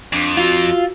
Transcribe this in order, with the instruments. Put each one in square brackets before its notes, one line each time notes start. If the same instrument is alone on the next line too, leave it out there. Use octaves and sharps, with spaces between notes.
[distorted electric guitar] F2 [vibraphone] D4
[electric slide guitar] F4 [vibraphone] F#4 F5 E6